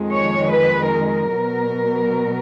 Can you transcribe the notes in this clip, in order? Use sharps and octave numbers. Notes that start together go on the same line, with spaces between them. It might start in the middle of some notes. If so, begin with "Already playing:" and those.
Already playing: F2 D#3 G#3
C#5
B4
A#4
B2 F#3 B3